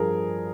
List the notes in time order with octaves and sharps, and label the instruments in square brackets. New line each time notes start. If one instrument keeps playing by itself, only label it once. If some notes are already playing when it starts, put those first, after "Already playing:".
Already playing: [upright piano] G2 F3 G#4 A#4